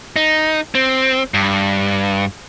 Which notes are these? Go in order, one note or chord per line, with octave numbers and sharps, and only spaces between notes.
D#4
C4
G2